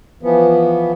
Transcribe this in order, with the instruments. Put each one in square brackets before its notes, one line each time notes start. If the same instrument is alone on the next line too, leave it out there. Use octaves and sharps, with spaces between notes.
[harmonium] E3 F3 B3